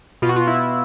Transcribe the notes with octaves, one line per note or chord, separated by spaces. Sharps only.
B2 F4
F#4
F4
E4